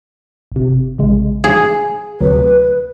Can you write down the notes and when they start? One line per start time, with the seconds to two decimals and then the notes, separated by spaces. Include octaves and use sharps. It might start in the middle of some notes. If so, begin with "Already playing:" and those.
0.52 G1 C3
0.98 A#1 C#3 G#3
1.44 G#4
2.21 D2 C3 F#3 B4